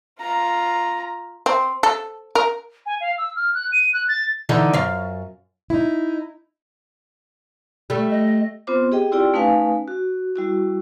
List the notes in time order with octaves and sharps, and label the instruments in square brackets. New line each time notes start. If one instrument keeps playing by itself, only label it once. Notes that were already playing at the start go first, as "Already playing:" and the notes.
[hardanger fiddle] F4 A#5
[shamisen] C4
A4
A#4
[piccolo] G#5
F5
E6
F6
F#6
D#7
F#6
A6
[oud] D3 E3 D#4
F#2 F5
[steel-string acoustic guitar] D#4 E4
[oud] G3 A3
[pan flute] D#5
[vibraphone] B3 C4 F4 C5 D6
G4 G#4 D#5 G5
C4 E4 F4 G4 D5 G5
A3 C#4 D#4 B4 F5 G#5
F#4
G3 E4 F#4